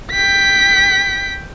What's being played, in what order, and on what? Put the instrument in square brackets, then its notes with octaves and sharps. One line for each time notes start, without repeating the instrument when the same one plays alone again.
[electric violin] G5 B6